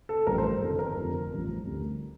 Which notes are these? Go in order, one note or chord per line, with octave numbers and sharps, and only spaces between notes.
A4
A1 G2 F3 A#4
C5
G1 F2 D#3 A4
A#4
F1 F2 D3 F3
A1 G2 F3
D2 D3 G3